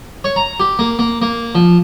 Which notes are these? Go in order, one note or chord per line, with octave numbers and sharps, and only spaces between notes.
C#5
A#5
G4
A#3
A#3
A#3
F3